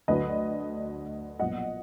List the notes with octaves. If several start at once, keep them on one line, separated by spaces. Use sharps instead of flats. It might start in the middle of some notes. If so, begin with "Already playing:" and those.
D2 D3 F#3 B4 D#5
B1 A#2 F3 B3 D#5 F#5